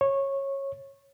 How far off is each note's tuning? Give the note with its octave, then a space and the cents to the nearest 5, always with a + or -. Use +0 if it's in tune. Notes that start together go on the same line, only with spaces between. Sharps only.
C#5 -15